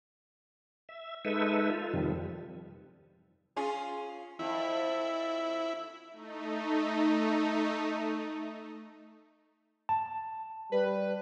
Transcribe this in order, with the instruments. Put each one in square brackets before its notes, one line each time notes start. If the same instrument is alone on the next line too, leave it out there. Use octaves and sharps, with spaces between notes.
[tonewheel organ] E5
G#3 D#4 A4 B4 E5
F4
F2 C3 D#3 F3 G3
[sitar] C#4 F4 G#4
[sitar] F2 [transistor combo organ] E4
[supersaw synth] A3 D#4
[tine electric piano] A5
[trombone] G3 [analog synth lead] B4